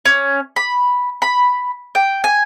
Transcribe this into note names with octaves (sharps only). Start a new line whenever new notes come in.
C#4
B5
B5
G5
G#5